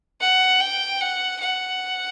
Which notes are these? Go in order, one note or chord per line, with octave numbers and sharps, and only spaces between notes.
F#5
G5
F#5
F#5